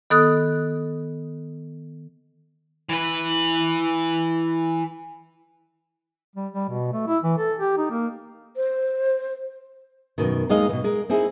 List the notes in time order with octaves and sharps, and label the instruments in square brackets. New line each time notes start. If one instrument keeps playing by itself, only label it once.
[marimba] D#3 B3 A4 D#6 F#6
[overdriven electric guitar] E3 B4
[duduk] G3
G3
B2
A3
E4
E3
A4
G4
D#4
A#3
[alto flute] C5
[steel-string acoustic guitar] F#2 B2 D#3
D#2 D#3 G#3 D#4 D#5 F5
B2 E3
G#3 A#4
C4 D#4 E4 G#4